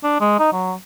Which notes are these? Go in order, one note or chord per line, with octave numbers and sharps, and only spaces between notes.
D4
G#3
D#4
F#3